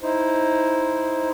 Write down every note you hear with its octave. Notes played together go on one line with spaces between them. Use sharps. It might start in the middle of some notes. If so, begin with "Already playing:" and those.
D#4 E4 C5